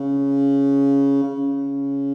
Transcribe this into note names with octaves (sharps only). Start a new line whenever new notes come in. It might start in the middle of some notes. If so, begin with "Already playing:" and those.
Already playing: C#3
C#3